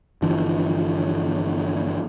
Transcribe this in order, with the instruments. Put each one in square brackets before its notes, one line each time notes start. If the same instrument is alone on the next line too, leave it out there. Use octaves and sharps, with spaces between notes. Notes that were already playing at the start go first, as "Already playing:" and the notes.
[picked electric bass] G1 E3 F3 D4